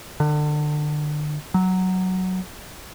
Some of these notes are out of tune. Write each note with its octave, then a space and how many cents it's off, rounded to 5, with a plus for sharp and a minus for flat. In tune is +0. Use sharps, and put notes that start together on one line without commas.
D3 +30
F#3 +5